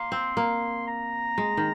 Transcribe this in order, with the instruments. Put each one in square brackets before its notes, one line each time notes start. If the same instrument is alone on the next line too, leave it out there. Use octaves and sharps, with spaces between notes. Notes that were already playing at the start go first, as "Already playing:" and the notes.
Already playing: [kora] A#3 [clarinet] C6
[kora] C4
A#3
[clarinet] A#5
[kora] G#3
D#3